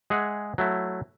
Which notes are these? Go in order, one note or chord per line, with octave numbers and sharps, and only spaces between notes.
G#3 G#4 E5 F#5
F#3 A3 E4